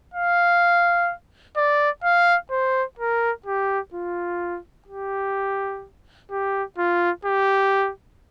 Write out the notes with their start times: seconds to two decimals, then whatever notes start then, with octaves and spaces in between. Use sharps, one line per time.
0.14 F5
1.57 D5
2.04 F5
2.51 C5
2.99 A#4
3.46 G4
3.94 F4
4.88 G4
6.31 G4
6.78 F4
7.25 G4